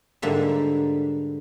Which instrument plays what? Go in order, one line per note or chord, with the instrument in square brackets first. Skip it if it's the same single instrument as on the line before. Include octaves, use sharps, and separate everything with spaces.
[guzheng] G#2 D3 G3 A#3 E5